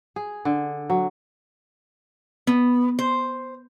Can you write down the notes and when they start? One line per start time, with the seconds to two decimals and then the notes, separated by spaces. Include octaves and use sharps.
0.16 G#4
0.45 D3
0.90 F#3
2.47 B3
2.99 C5